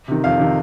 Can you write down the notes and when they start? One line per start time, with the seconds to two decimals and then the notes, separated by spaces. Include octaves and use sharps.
0.08 C3 D#3
0.24 F2 F5
0.39 C3 D#3